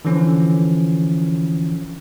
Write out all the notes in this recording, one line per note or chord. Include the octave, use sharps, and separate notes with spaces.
D3 E3 F3 C#4